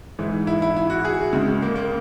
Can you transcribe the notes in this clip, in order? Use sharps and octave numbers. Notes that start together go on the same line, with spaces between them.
G#2 E3 G#3
E4
E4
E4
F#4
G#4
C#2 C#3 G#3
A#3
A#3